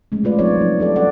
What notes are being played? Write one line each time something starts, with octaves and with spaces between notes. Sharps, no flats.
G#3 A3 C#4
G#3 A3 F4 B4 D5
F#3 C4 D#4 F4 C#5 D5
F3 D#4
D4 G4 A4 D5
G3 C#4 A4 D5 F#5